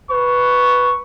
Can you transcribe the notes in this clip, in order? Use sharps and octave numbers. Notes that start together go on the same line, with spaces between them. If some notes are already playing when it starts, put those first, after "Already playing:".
B4 C#6